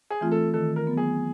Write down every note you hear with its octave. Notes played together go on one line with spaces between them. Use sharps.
G#4
E3 A3 C4 F4
A4
D#3 A4
A#4
F#3 B3
G#4